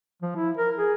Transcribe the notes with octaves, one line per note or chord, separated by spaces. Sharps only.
F3
E4
A#4
G#4